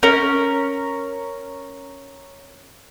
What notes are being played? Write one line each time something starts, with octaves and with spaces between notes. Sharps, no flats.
C#4 A#4